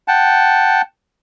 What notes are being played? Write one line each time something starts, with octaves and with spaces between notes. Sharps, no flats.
F#5 G5 A5